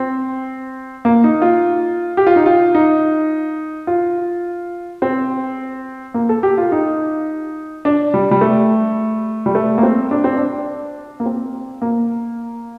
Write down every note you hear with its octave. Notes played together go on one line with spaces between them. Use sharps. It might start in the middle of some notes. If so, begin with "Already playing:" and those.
Already playing: C4
A#3
D#4
F4
G4
F4
D#4
F4
D#4
F4
C4
A#3
A4
G4
F4
D#4
D4
G3
G3
A3
G3
A3
A#3
C4
D4
C4
D4
A#3
C4
A#3